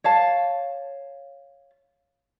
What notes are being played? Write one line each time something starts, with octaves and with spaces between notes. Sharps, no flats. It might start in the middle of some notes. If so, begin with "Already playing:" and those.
C#5 F5 A5